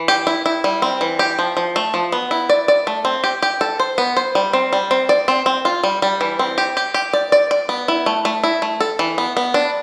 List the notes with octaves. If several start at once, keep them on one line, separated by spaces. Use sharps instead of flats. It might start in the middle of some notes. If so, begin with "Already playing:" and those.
Already playing: E3
G4
E4
E4
G3
C4
E3
G4
F3
F3
A3
F3
B3
E4
D5
D5
A3
C4
G4
G4
A4
C5
B3
C5
G3
C4
G3
C4
D5
C4
C4
F4
G3
G3
E3
C4
G4
G4
G4
D5
D5
D5
B3
E4
A3
A3
E4
A3
A4
E3
B3
B3
D4